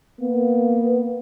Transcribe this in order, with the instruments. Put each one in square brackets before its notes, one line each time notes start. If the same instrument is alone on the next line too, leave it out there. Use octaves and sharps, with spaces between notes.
[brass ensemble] A#3 B3